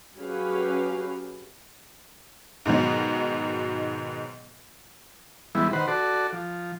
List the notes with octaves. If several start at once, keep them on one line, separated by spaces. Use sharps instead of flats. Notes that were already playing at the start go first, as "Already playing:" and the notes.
F#3 C#4 G4 G#4 B4 F5
G#2 B2 D#3 F#3
E3 G3 G#3 B3 E4
D#3 B4 C5 F#5
F#4 A4 D5
F3